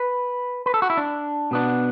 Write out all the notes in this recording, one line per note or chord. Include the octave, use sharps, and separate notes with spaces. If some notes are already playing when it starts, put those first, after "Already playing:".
Already playing: B4
B4
A4
F#4
E4
D4
B2 B3 D4